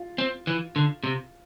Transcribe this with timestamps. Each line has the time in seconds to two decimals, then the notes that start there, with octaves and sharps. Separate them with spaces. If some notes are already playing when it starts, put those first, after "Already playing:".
Already playing: F4
0.18 C4
0.47 E3
0.76 D3
1.04 C3